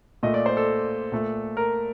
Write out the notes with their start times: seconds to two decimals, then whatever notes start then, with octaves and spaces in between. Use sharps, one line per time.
0.23 A#2 A3 D#5
0.34 D5
0.46 C5
0.57 A4
1.12 A#2 A3
1.57 A#4